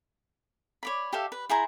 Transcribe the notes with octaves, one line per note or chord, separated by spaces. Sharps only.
C#5 D5 B5
G4 A4 E5 F5
B4
E4 G#4 C5 A#5